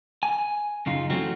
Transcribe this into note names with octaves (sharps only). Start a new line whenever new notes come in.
G#5
F#2 C#3 D#4 F4
E3 F#3 A3 C4 C#4 F#4